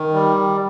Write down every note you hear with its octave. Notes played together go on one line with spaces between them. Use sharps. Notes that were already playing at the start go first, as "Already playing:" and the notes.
Already playing: D#3
G3